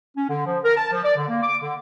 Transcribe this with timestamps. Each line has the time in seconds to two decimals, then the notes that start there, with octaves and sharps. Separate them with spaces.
0.16 C#4
0.28 D3
0.46 F3
0.63 A#4
0.77 A5
0.92 F3
1.03 D5
1.16 D3
1.28 A#3
1.42 D6
1.61 D3